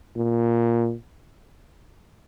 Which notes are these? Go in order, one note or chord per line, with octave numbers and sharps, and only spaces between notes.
A#2